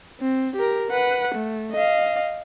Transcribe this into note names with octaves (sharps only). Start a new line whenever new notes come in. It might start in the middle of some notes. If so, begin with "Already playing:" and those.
C4
G4 A#4
B4 F#5
A3
D#5 F5